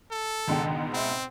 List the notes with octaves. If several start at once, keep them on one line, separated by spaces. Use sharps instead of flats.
A4
C#2 G#2 B2 D#3 D4 G5
C4 E5 B5